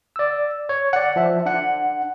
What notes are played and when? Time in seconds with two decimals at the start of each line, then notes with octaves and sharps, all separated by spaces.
0.16 D5 E6
0.69 C#5
0.93 D5 F#5
1.16 F3 E5
1.46 D4 F#5